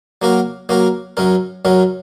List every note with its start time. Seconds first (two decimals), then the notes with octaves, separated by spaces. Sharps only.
0.22 F#3 A#3 F#4 A#4
0.69 F#3 A#3 F#4 A#4
1.17 F#2 F#3 C#4 A#4
1.65 F#2 F#3 C#4 A#4